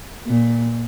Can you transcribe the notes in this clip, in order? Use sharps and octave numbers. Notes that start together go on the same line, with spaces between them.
A#2